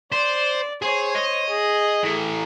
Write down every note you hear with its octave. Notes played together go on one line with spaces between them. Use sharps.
C5 D5
G#4 C5 C#5
D#5
G#4
E3 A3